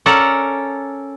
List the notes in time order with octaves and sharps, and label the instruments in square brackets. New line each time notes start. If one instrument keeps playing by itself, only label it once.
[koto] C#4 A4 A#4 D5 F#5